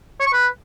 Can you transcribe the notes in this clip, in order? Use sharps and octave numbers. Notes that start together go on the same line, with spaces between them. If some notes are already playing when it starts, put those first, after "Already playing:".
C#5
C#6
B4